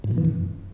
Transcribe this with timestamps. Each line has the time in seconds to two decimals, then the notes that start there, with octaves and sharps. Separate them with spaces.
0.04 G#2
0.11 A#2
0.18 E3
0.25 F#2